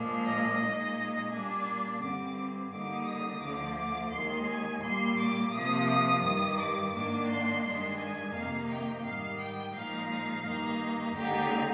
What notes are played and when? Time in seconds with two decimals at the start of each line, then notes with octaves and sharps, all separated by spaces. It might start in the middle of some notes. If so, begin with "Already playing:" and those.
Already playing: A#2 F3 G#3 D4
0.25 D#5
0.60 A#2 G#3 D#4
1.30 A#2 G3 A#3 D4 G#5
2.00 G2 D3 G3 C4 D6
2.71 D3 G3 A#3 D#4 D6
3.07 D#6
3.41 D2 D3 F3 D6
3.77 D6
4.12 D#2 D#3 G#3 C6
4.47 G#5
4.82 A#2 G3 A#3 C6
5.18 D6
5.52 C3 F3 A#3 D#6
5.87 D#6
6.23 G2 D#3 G3
6.58 D6
6.93 G#2 D#3 A#3 D4 D6
7.29 C6
7.64 G2 D#3 G#3 D4 C6
7.99 G#5
8.34 F2 C3 D#3 A#3 D#4 F5
8.69 G5
9.05 G#2 D#3 G3 F5
9.40 G5
9.75 A#2 F3 G#3 D#4 F5
10.45 G2 D#3 A#3 D#4
11.15 D#2 D3 G#3 D#4 G4